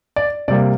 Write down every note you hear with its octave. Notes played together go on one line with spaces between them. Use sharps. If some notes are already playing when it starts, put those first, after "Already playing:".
D5
C3 G3 A#3 D5